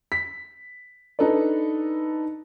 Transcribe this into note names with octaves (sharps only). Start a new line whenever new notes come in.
B6
D4 D#4 A4 B4 D5